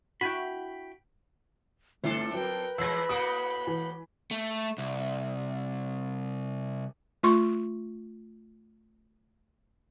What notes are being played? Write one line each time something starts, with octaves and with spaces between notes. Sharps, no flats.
E4 F#4 G5 G#5 B5
G1 A3 C4 D4 E4 A4
F#3 A#4 B4 G5
E3 G#3 B5 E6 A#6
A2 A#3 F#4 D#6 D7
E3
A3
C2
A3 F4 C6 C#6